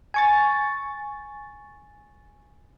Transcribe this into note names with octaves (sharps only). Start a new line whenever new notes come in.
G#5 C#6 A6